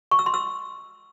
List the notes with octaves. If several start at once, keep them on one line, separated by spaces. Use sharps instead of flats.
C#6
E6
C6
E6